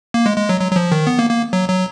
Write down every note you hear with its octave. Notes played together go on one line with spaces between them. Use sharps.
A#3
G#3
G#3
F#3
F#3
F#3
F3
D#3
B3
A#3
A#3
F#3
F#3